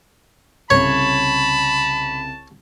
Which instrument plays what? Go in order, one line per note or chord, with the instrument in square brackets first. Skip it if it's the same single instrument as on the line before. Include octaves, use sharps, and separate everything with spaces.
[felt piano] C2 C#3 [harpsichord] C#5 [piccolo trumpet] A5 [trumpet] B5